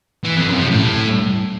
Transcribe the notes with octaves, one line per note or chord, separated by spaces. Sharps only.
E3
F2
F#2
C3
A2